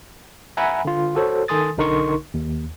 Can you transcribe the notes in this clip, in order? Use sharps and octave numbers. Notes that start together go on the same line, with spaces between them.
E5 F#5 G#5 A#5 B5
D3 F4
F#4 A4 C5 C#5
D#3 A4 G#5 C6 D#6 A6
B1 D3 D#4 A#4 C6 C#6
D#2